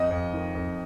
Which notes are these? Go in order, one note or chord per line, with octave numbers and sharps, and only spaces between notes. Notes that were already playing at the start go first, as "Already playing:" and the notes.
Already playing: F2 D#5
F2
D#3
F2